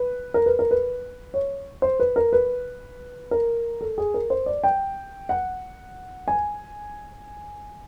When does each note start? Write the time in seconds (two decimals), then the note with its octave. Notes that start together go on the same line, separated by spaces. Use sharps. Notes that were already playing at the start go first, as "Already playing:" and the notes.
Already playing: B4
0.34 A#4
0.46 B4
0.59 A#4
0.71 B4
1.34 C#5
1.82 C5
2.00 B4
2.16 A#4
2.33 B4
3.31 A#4
3.81 A4
3.98 G#4
4.14 A#4
4.30 C5
4.46 D5
4.64 G5
5.29 F#5
6.28 G#5